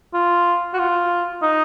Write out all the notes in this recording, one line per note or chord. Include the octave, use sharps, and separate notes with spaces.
F4
F#4
F4
D#4